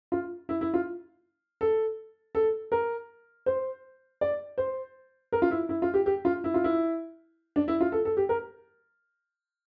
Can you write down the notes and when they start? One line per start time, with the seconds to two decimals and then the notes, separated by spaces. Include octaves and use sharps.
0.12 F4
0.49 E4
0.61 E4
0.74 F4
1.61 A4
2.35 A4
2.72 A#4
3.46 C5
4.21 D5
4.58 C5
5.32 A#4
5.42 F4
5.51 E4
5.69 E4
5.82 F4
5.94 G4
6.06 G4
6.25 F4
6.44 E4
6.54 F4
6.64 E4
7.56 D4
7.68 E4
7.81 F4
7.92 A4
8.05 A4
8.17 G4
8.29 A#4